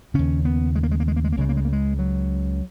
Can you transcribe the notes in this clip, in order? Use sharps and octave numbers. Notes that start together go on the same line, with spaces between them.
D#2 C#3 C#4
B3
G#3
A#3
G#3
A#3
G#3
A#3
G#3
A#3
C#2 C#3 G#3
A#3
G#3
A#3
G#3
F#3